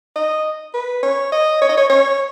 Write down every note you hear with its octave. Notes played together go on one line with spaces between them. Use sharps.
D#5
B4
C#5
D#5
C#5
D#5
C#5
C#5